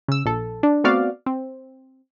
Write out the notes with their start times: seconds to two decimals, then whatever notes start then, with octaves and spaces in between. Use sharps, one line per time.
0.08 C#3 E6
0.25 A#1 A4
0.63 D4
0.84 A3 B3 C4 F#4 D5 F5
1.26 C4